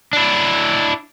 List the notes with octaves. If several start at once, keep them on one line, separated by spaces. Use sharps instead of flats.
D4 E4